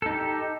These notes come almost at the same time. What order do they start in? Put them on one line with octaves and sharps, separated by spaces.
A4 D#4 G4